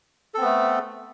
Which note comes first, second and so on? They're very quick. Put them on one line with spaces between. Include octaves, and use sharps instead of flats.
A4 C4 B3 A3